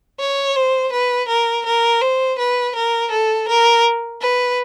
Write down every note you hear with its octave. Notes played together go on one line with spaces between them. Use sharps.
C#5
C5
B4
A#4
A#4
C5
B4
A#4
A4
A#4
B4